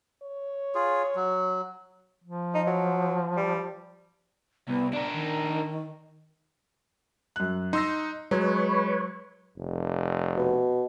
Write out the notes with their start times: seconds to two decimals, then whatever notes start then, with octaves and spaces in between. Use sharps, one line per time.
0.23 C#5
0.75 F4 G#4
1.16 F#3
2.24 F3
2.54 D#4
2.67 F#3
3.37 G3
4.68 C2 B3
4.93 D4 A#4 D5
5.14 D#3
7.36 F#2 F#6
7.73 D#4 C6 E6 A#6
8.31 F#3 G#3 B4 C#5
9.58 F1
10.37 B2